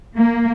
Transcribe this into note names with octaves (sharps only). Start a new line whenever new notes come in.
A#3